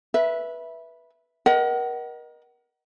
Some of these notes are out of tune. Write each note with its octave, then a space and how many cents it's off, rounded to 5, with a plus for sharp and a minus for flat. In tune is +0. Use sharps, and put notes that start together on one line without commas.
B4 -15 E5 +0
A#4 +35 D#5 -10 F#5 +35